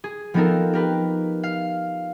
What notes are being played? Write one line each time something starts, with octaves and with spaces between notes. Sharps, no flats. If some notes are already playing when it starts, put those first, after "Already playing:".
G#4
F3 B3 C4 D#4 A4 A#4
G4 A#4 B4
F5